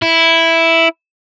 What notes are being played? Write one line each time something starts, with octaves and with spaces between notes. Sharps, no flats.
E4